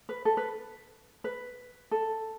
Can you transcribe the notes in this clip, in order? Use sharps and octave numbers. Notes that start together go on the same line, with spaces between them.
B4
A4
B4
B4
A4